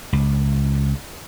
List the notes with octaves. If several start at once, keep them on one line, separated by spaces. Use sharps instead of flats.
C#2